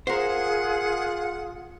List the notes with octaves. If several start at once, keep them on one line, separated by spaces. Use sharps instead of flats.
F4 G#4 A#4 C5 F#5